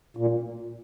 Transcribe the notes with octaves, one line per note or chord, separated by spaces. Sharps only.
A#2